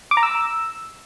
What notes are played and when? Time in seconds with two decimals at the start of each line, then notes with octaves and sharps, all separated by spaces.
0.11 D6
0.17 A#5
0.23 E6